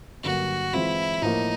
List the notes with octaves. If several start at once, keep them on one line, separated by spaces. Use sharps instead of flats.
G2 D3 F#3 A#3 F#4
E3 G#3 C4 E4 F4
A2 F3 A#3 D#4